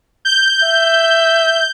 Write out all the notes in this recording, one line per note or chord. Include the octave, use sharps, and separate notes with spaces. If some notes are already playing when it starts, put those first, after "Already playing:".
G6
E5